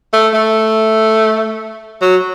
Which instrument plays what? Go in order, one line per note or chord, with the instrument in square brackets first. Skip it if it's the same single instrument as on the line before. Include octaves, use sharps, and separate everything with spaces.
[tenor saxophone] A3
A3
F#3